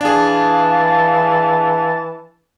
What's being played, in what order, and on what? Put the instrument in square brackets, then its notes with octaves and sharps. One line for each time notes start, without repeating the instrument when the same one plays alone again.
[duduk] E3 [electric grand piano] D4 G#4 [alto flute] F5 [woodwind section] A5